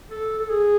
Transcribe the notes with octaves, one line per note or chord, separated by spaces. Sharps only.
A4
A4
G#4